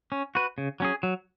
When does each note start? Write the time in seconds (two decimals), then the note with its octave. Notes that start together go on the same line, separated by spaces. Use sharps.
0.12 C#4
0.35 F#4 B4
0.58 C#3
0.80 F#3 C#4 G#4
1.03 F#3